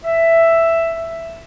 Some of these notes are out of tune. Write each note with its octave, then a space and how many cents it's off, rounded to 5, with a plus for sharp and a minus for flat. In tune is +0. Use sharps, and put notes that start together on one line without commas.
E5 +5